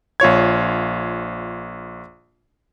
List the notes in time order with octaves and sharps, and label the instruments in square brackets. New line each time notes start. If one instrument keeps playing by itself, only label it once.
[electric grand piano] A#1 F4 C#5 G#6